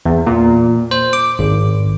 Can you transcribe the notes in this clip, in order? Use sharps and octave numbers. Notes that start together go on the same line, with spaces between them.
E2
A#2
C5
D6
G#1